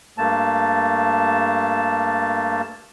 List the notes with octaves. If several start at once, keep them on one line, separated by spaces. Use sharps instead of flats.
G2 A3 A#3 A5